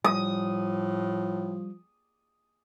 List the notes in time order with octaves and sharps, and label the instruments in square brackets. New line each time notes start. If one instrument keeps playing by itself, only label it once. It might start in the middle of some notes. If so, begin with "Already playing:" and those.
[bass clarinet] A2 [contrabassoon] F3 [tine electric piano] G3 [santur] D#6